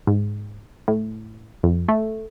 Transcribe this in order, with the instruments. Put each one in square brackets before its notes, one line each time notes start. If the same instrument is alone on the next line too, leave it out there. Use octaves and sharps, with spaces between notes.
[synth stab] G#2
A2
F2
A3